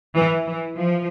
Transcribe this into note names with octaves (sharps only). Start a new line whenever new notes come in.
E3
E3
F3